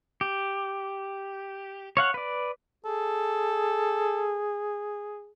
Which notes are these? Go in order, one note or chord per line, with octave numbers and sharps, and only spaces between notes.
G4
C#5 F5 F#5
B4 D5
G#4 A4